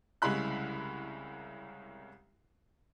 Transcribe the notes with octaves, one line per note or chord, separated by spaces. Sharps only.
C2 C#3 G#3 E4 B5 F#6